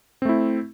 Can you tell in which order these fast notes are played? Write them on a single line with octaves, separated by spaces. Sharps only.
C4 A3 E4